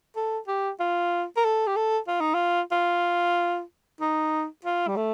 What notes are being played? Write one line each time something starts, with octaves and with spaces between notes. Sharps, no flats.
A4
G4
F4
A#4
A4
G4
A4
F4
D#4
F4
F4
D#4
F4
G3
A3